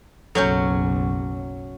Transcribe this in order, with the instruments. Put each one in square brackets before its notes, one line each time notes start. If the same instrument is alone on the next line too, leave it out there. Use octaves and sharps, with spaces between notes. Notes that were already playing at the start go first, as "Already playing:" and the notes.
[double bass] F#1 B1 [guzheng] F#3 C#4 [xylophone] A4 C#5 G6